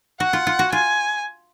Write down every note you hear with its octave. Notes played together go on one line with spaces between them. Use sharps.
F#4 F#5
F4
F4
F#4
F4 G#5